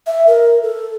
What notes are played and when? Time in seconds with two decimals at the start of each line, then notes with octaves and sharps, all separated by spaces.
0.07 E5
0.27 A#4
0.63 A4